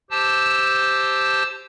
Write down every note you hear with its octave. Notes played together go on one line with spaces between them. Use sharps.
G4 C5 A5 E6